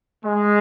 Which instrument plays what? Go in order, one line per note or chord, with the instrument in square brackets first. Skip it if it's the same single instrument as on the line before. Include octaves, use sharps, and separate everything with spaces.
[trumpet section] G#3